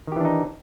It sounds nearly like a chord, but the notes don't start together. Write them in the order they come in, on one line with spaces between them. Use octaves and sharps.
D#3 G4 E3 D4 D#4